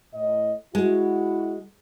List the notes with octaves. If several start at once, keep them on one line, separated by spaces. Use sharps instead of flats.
A2 D#5
G#3 E4 F#4